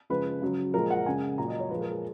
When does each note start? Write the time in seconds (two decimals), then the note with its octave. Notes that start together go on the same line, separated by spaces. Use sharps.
0.10 C#3 F3 G#3 B4
0.42 C#3 F#3
0.74 A#2 F3 G#3 A#4
0.90 F#5
1.05 C#3 G#3 G#5
1.38 A#2 F#3 A#5
1.48 D#5
1.60 C#5
1.70 A#2 F3 G#3 B4
1.81 A#4
1.91 G#4